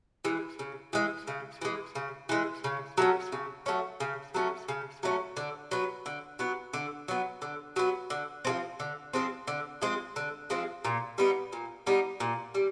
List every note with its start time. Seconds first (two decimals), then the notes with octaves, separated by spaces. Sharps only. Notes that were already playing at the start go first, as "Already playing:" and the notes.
0.25 E3 G#3
0.59 C#3
0.93 E3 G#3
1.27 C#3
1.61 E3 G#3
1.95 C#3
2.29 E3 G#3
2.64 C#3
2.98 F#3 A3 C#4
3.32 C#3
3.66 F#3 A3 C#4
4.00 C#3
4.34 F#3 A3 C#4
4.69 C#3
5.03 F#3 A3 C#4
5.37 D3
5.71 F#3 B3
6.06 D3
6.39 F#3 B3
6.74 D3
7.08 F#3 B3
7.42 D3
7.76 F#3 B3
8.10 D3
8.45 F3 G#3 C4
8.80 D3
9.13 F3 G#3 C4
9.47 D3
9.82 F3 G#3 C4
10.16 D3
10.50 F3 G#3 C4
10.85 A#2
11.18 G3 B3 D#4
11.53 A#2
11.87 G3 B3 D#4
12.20 A#2
12.55 G3